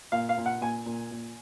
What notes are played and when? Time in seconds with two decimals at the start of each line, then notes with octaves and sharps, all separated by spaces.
0.12 A#2 F5
0.29 F5
0.38 A#2
0.46 F#5
0.61 A#2 G#5
0.86 A#2
1.11 A#2